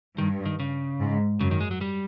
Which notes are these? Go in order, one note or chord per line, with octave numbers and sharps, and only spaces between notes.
G2 D#3
D#3
C#3
G#2
F#2 C#3
D#3
G#3
F#3
G3